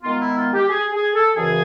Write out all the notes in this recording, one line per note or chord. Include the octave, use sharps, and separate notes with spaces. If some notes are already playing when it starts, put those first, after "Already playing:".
D#3 G#3 B3 F4
E4
F4
G4
G#4
G#4
A4
F#2 C#3 E3 G#4